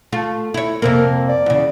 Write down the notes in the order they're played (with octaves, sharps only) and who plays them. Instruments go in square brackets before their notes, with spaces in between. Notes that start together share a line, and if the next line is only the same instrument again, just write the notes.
[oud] A3 F4
E4 C#5
[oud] F2 C3 A#3 [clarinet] A#4
[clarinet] D5
[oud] E2 C#3